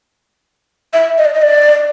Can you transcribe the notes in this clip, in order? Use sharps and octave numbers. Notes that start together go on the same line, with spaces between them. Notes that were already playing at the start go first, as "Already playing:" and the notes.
E5
D#5
D5
D#5
D5